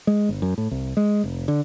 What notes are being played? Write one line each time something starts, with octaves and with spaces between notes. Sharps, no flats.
G#3
G1
F#2
A2
C2
G#3
F1
D3